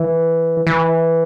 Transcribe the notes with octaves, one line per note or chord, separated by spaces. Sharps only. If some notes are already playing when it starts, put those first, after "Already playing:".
Already playing: E3
E3